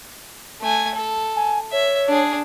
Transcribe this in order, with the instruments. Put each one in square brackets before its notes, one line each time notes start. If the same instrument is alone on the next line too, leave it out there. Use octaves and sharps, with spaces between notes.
[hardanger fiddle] A3 G#5
A4
[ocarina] G#5
[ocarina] C#5 [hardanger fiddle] E5
[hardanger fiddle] D4 G#4